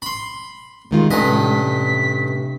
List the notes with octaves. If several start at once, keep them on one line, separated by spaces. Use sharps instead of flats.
B5 C6
C3 D#3 G#3 F4
A1 G2 C3 D#5 B6